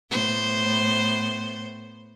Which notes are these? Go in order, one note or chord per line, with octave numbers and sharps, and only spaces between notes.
A2 B3 C5